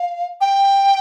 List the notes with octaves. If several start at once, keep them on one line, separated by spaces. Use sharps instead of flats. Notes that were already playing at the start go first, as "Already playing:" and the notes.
Already playing: F5
G5